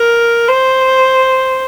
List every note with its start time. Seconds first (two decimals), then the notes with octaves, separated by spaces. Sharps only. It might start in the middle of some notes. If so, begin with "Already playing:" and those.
Already playing: A#4
0.48 C5